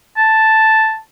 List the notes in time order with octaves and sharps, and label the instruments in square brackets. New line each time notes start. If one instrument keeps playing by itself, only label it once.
[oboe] A5